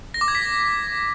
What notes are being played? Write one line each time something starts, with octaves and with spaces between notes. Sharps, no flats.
A#6
D6
G#6
B6